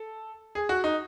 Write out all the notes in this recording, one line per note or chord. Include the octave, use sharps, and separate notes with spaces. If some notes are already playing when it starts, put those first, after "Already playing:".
Already playing: A4
G#4
F#4
D#4